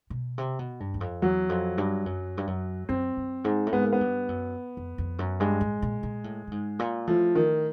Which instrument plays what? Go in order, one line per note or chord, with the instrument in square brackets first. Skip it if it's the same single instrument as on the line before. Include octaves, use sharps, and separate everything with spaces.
[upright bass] B2
C3
B2
G2
E2
F2
[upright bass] E2 [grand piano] F#3
[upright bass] F2
G2
F#2
G2
F#2
[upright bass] F#2 [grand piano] C4
[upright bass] F#2
G#2
A2
[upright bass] G#2 [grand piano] B3
[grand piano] A#3
B3
[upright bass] G2
F#2
F2
F2
F#2
[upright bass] G2 [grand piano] G#3
[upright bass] A2
A#2
A#2
A2
A2
G#2
A#2
[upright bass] A2 [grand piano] F3
[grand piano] D#3